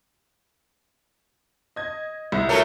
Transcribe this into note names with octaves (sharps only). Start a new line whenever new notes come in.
D#5 G#6
C2 E5
F#3 A3 A#4